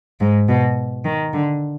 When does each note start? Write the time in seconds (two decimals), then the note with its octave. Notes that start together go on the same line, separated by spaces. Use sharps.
0.20 G#2
0.49 B2
1.05 D#3
1.33 D3